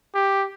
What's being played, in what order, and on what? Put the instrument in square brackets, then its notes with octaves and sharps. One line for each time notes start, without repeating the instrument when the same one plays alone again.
[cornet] G4